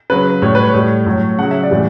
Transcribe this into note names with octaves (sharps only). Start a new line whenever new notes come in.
C#3 F#3 B4
A2 G3 C#5
B4
C#5
A2 G3
A2 F#3
C#3 F#3 F#5
E5
D5
A2 E3 G3